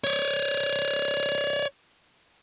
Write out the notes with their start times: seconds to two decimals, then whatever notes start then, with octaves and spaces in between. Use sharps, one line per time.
0.04 C#5 D5